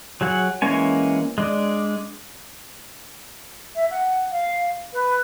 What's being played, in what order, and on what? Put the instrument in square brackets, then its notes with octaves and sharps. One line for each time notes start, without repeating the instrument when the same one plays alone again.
[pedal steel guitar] F#3 G#4 F#5
E3 G#3 A#3 C#4 G#5
G#3 D4
[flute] E5
F#5
F5
B4